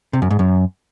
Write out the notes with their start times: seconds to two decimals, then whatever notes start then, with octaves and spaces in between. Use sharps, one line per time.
0.13 C3
0.22 F#2
0.30 G#2
0.39 F#2